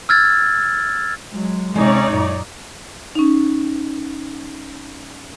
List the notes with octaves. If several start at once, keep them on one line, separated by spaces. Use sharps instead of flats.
E6 F6 G#6 A6
F#3 G#3
C3 G#3 C#4 D#4 C#5 D5 E5
F#2 A#2
C#4 D#4